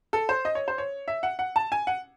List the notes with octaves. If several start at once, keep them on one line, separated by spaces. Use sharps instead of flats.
A4
C5
D#5
C#5
C5
C#5
E5
F#5
F#5
A5
G#5
F#5